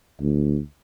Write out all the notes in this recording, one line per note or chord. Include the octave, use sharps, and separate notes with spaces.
D2